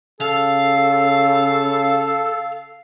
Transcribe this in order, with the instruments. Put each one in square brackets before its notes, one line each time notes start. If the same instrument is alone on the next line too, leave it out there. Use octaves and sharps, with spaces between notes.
[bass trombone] C#3 [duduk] A4 [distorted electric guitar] F5